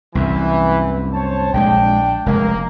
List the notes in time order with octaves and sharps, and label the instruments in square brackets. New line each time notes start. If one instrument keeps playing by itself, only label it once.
[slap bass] C2 F#2 [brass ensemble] E3
[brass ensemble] C5 C#5 A5
[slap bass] A#1 D#3 G#3 [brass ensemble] D4 G5
[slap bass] F1 G#3 [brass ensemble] A#3